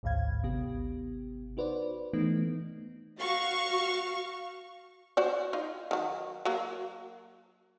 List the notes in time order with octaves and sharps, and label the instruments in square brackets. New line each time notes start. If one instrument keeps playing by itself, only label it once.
[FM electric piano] A1 D2 G#2 F5 G#6
G#1 C3 B3 G4
D#4 F#4 B4 C5 D5
E3 A3 B3 D#4
[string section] F#4 F5 C#6
[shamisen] F#4 C5 D5
D#4 F4
D#3 F#3
F#3 A#3